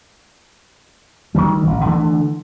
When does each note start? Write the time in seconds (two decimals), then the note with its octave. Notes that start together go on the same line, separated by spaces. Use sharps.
1.35 D2 D#3 E3 G3
1.67 A1
1.86 D3 E3 G#3 A3